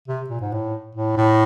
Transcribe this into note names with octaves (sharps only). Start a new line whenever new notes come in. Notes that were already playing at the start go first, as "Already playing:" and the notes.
C3
A#2
G#2
A2
A2
A2